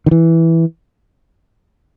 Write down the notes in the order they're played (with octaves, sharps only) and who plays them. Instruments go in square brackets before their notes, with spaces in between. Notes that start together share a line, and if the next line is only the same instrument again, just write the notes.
[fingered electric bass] D#3
E3